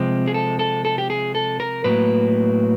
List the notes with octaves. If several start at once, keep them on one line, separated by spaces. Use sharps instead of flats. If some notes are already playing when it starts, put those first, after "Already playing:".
Already playing: C3 F3 G#3 C4
G#4
A4
A4
A4
G4
G#4
A4
A#4
A2 F#3 A#3 B4